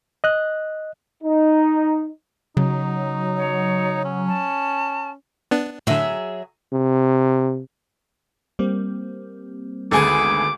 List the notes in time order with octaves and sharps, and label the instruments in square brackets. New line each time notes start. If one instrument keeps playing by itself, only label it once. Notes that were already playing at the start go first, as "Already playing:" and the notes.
[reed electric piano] D#5 F#6
[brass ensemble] D#4
[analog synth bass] C#3 [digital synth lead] F#3 [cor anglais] D#4
[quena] C#5
[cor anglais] C#4
[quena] A5
[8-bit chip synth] B3 D4
[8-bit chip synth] A2 D3 [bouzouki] F#3 G#4 E5
[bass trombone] C3
[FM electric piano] G3 A#3 C4
[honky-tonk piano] G#1 D2 G#5 [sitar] B3 G#4 A4 [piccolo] D6